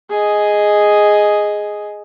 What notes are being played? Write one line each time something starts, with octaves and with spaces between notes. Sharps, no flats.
G#4 D#5